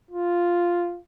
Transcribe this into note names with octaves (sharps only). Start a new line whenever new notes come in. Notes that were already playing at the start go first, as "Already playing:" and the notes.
F4